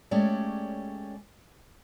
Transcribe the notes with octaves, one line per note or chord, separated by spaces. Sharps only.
G#3 A3 C#4 G4 C#5 D5